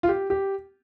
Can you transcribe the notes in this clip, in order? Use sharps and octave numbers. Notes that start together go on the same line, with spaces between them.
F4
G4
G4